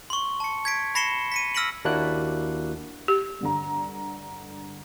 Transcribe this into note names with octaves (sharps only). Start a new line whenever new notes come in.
C6 C#6
A5 C#7
G#6 B6 D7
B5 A#6 C7 C#7 E7 G7
B6 C#7 D#7
E6 F6 A#6 B6 D7 F#7
D#2 A#3 D4 E4 F#4 F#6
G4
G2 D3 A#5